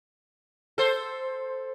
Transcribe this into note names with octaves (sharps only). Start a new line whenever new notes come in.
A4 C5